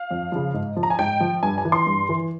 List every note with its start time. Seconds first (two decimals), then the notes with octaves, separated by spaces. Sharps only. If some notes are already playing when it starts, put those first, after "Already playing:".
Already playing: F5
0.11 F2
0.32 C#3 F3
0.54 G#2
0.77 F3
0.83 A#5
0.90 G#5
0.99 G#2 G5
1.20 F3
1.43 G2 G#5
1.58 G#5
1.65 E3
1.72 C6
1.86 G2
2.09 E3